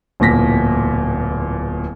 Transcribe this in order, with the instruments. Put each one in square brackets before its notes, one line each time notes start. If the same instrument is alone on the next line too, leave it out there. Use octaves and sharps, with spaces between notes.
[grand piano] D1 E2 A#2 A#6 B6